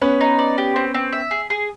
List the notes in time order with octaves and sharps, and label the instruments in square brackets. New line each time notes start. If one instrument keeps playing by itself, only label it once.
[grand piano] B3 C#4 [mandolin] B4
[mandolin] D#4
D5
G4
C4
C4
E5
G#4
G#4